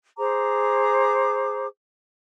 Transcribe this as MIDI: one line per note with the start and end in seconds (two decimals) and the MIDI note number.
0.17 1.66 68
0.17 1.66 72
0.17 1.66 82
0.17 1.66 86